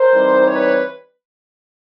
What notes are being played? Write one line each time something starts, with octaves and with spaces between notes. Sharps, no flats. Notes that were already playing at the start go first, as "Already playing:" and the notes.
Already playing: A#4 C5
E3 G3 C4 D#4
B4 C#5